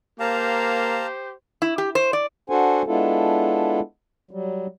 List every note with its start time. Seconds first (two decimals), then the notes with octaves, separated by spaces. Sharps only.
0.20 A#3 G4 C5 F5 A5 A#5
1.62 E4
1.78 G4
1.95 C5
2.13 D5
2.50 D4 F#4 A4 C5 F#5 G#5
2.87 G#3 B3 D4 E4 F4 A4
4.31 F#3 G3